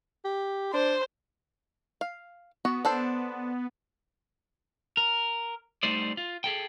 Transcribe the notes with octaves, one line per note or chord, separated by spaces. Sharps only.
G4
D4 C5
F5
B3 F#4
D4 A4 C5
A#4
G3 A3 D#4 C5 D5
F4
G#4 A4 G5